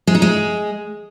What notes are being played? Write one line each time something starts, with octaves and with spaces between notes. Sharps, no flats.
G#3
D#4
G#3